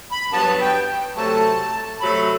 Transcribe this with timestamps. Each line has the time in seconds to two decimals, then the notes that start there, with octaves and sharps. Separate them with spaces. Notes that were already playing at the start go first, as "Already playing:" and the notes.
0.12 B5
0.33 G2 F#3 B3 A5
0.61 G5
1.17 C3 F#3 A3 A5
2.01 C3 F#3 A3 B5